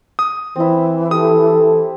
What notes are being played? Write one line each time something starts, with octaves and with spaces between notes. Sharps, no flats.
D#6
E3 C4 E4
G4 A4 D#6